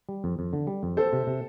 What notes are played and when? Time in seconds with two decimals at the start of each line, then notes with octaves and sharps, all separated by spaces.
0.09 G3
0.24 F2
0.39 F2
0.53 D3
0.67 G3
0.83 F2
0.97 C4 A4 C5
1.13 C3
1.27 C3